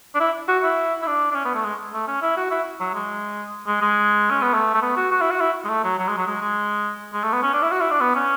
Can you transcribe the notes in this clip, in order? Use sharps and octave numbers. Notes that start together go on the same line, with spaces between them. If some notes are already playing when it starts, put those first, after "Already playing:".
D4
E4
F#4
E4
E4
D4
D4
C#4
B3
A3
G#3
A3
C#4
E4
F#4
E4
F#3
G#3
G#3
G#3
C#4
B3
A3
A3
B3
F#4
F#4
E4
F#4
E4
G#3
A3
F#3
F#3
G#3
F#3
G#3
G#3
G#3
A3
B3
C#4
D4
E4
F#4
E4
D4
B3
C#4